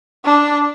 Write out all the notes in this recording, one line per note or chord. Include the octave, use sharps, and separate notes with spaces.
D4